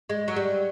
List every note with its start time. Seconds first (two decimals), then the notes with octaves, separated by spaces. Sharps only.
0.09 G#3
0.28 F#3
0.36 G3